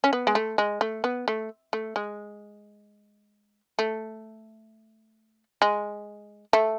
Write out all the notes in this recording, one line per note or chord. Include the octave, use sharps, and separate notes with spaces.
C#4
B3
G#3
A3
G#3
A3
B3
A3
A3
G#3
A3
G#3
A3